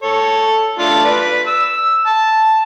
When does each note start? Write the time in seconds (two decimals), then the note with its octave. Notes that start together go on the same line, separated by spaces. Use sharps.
0.03 A4 C#5
0.79 A3 D4 F4
1.05 B4 D5
1.47 E6
2.07 A5